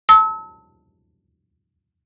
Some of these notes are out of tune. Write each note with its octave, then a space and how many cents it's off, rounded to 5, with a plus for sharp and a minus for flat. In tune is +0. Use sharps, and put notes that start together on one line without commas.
A5 +15 E6 -35